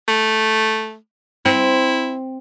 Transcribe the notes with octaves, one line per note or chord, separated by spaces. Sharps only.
A3
C4 E4